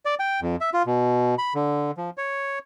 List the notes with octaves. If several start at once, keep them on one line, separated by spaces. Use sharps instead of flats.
D5
G5
F2
E5
F4
B2
B5
D3
F3
C#5